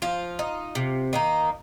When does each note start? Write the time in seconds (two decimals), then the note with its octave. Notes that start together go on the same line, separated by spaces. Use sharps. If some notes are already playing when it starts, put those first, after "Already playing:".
0.02 F3 F4
0.39 D#4
0.75 C3
1.13 D#3 A#3 D#4